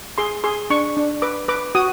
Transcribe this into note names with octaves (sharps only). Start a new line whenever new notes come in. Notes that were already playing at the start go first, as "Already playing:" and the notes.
G#4 C6
G#4 C6
D4 C#6
D4
B4 D6
B4 D6
F#4 D#6